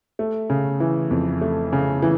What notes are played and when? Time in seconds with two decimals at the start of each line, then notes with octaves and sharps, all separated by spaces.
0.19 A3
0.50 C#3
0.80 E3
1.11 F2
1.41 A3
1.73 C#3
2.02 E3